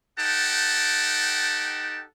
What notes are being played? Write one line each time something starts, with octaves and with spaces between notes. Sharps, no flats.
D#4 G4 A4 F#5 G5 A5